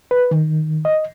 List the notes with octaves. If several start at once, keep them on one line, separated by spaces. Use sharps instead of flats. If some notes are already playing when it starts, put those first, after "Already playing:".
B4
D#3
D#5